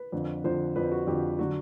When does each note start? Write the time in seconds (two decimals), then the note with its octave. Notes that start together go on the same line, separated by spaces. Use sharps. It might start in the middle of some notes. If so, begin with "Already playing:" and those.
Already playing: B4
0.12 F2 D3 F3
0.44 F2 D3 F3 C5
0.76 F2 D3 F3 B4
0.92 F#4
1.07 F2 D3 F3 G4
1.39 D3 F#3 F#4